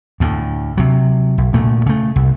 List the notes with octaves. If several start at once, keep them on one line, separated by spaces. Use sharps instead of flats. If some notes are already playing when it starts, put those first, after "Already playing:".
D2 A2
C3 F#3
B1
D2 A#2 A3
C#3 A3
C2